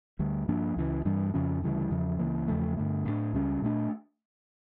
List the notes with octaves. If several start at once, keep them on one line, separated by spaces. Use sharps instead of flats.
D2 D3 G3
G2 F3 A#3 D4
C#2 C#3 E3
G2 E3 G3 D4
F2 C#3 F3 C#4
D2 C#3 E3 G3
E2 C#3 F3
C#2 C#3 E3 A#3
E2 C#3 F3 A3
G2 D3 A3
A2 G3 D4
C#2 C#3 G3 C#4
A#2 A3 D4